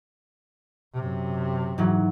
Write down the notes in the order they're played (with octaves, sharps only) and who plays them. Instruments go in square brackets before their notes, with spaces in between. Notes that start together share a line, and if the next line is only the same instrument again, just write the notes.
[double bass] F#2 C3
[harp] G#2 E3 F#3